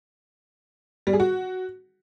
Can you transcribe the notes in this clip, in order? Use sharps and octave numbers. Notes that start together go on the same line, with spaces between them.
G3
G#4
F#4